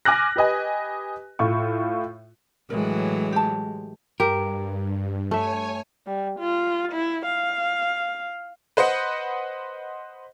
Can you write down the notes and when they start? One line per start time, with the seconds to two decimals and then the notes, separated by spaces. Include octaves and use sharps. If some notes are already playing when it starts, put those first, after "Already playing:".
0.05 G#5 D6 F6 F#6 A#6
0.36 G4 B4 D#5 G#5
1.39 A2 F4 C#6
2.70 A2 E3 F#3 G#3 A#4
3.32 G4 A5
4.20 G2 G4 A#4
5.31 A3 C#5 E5 G#5
6.07 G3
6.39 F4
6.92 E4
7.26 F5
8.77 B4 C5 D#5 F#5